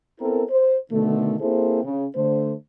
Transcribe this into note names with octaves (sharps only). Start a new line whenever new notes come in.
B3 C4 E4 A4 A#4
C5
B2 D3 D#3 A3
A#3 C4 E4 G#4 A4 C5
C#3
D3 A3 C5